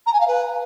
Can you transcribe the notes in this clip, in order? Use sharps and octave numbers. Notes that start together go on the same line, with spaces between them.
A#5
G#5
F5
B4